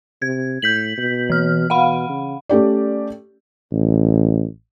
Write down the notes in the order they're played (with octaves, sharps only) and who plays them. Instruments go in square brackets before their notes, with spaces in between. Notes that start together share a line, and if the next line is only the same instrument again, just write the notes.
[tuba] C3 [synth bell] G#6
[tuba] A2 [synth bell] G6 B6 F#7
[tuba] B2
[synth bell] E3 F6
[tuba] B2 [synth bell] F5 F#5 B5
[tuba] C#3
[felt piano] A3 C#4 G4 D5
[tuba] A1